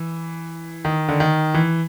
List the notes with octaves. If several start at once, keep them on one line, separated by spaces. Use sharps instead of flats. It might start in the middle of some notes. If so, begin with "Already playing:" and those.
Already playing: E3
D#3
D3
D#3
E3